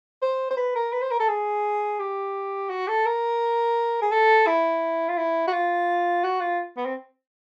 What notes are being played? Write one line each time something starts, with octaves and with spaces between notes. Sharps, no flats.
C5
C5
B4
A#4
B4
C5
A#4
A4
G#4
G4
F#4
A4
A#4
G#4
A4
E4
F4
E4
F#4
F4
F#4
F4
B3
C4